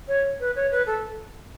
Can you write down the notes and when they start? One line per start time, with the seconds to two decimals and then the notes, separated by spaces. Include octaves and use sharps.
0.08 C#5
0.40 B4
0.56 C#5
0.71 B4
0.86 A4